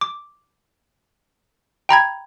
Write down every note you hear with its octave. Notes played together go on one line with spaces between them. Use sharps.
D6
G5 A#5 B5 G#6